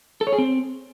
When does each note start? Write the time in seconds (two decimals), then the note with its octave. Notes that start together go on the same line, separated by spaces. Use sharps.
0.21 A4
0.27 C#5
0.33 G#4
0.38 C4